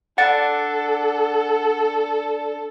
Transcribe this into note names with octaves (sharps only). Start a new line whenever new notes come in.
D4 A4 F#5